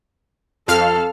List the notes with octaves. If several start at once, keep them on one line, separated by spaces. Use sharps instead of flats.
F2 A4 F5 F6